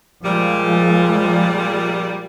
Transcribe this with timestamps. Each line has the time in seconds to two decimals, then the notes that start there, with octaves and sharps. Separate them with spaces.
0.24 A#2 F3 G3 G#3